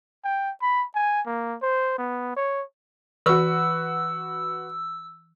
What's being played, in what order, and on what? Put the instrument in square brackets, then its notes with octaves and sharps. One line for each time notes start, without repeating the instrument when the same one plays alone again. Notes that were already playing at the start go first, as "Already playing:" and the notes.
[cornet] G5
B5
G#5
A#3
C5
B3
C#5
[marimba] E3 C#6 [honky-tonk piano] F#4 B4 [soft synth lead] E6